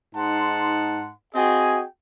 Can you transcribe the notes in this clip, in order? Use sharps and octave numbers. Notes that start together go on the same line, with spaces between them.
G#2 D#4 F#5 A5 C6
C4 F#4 G#4 D#5 G5 G#5